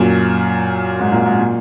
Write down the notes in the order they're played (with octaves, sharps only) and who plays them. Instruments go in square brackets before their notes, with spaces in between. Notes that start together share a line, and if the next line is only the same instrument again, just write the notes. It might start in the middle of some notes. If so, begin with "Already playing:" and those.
Already playing: [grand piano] F#2 A#2
G#2
A#2
G#2
A#2